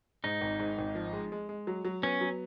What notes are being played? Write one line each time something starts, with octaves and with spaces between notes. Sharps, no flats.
G#2 D#4
G#1
G#2
G#1
F3
G#3
G#3
G#3
F#3
F#3
B3 C#4
F#3